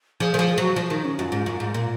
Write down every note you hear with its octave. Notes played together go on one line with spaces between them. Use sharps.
F3 G#4
D#3 F3 G#4
G#4
F#3 F#4
F3 F4
D#3 D#4
C#4
F#2 F4 F#4
G#2
F#2
G#2
A#2